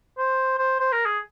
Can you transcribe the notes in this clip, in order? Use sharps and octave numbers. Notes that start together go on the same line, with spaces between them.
C5
C5
C5
A#4
G#4